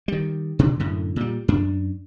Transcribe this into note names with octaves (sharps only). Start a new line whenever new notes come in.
D#3 G3
B2 D3 D#3
F#2 A2 D3
A#2 G3
F#2 D4